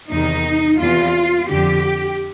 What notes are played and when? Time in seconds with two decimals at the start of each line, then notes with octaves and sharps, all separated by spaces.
0.10 E2 C3 D#3 D#4
0.80 E2 C3 E3 F4
1.50 F2 D3 G4